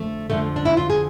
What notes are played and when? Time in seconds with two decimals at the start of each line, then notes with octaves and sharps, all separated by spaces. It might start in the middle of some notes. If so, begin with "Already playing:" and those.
Already playing: F2 D3 F3 A3
0.30 F2 D3 F3 A3
0.56 D4
0.65 E4
0.77 F4
0.90 G#4